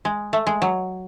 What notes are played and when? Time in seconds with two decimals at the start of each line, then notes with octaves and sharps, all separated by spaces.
0.05 G#3
0.33 A3
0.47 G#3
0.62 F#3